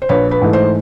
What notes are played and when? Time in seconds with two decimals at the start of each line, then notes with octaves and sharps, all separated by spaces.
0.02 C5
0.09 A#1 B4 C#5
0.31 B4
0.41 G#2 E3 A3
0.53 C5